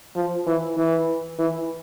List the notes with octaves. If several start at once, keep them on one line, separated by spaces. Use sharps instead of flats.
F3
E3
E3
E3